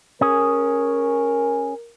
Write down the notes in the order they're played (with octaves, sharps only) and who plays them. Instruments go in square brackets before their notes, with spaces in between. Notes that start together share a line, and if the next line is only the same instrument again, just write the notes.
[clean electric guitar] C#4 G#4 [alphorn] A#4